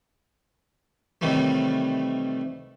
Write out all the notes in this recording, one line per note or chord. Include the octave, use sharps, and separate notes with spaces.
A2 C3 D#3 E3 G3 A3